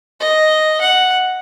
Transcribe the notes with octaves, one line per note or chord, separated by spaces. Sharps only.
D#5
F#5